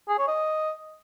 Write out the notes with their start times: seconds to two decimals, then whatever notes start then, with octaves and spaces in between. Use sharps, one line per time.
0.09 G#4
0.18 C#5
0.28 D#5